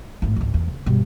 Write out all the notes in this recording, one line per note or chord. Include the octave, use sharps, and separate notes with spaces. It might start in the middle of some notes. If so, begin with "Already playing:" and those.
G#1 A2
G#1 C#2
E2
C#3
G2 B2